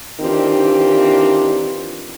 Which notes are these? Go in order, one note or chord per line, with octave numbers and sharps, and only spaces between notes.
D#3 E3 C4 D4 F4 G4